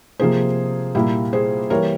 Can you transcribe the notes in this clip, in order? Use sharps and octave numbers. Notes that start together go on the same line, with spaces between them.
C3 F3 A#3 G#4 C5
A#2 G3 A#3 E4 G4
G#4 C5
E3 G3 A#3 A#4 C#5